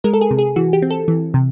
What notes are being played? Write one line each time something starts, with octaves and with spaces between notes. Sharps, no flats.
G#3 A#4
A4
G#4
C3
G#4
E3 F#4
G4
C4
A4
E3
C3